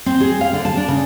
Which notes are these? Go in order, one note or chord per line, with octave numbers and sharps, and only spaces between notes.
C4
G#4
F5
D3
A5
D4
C#3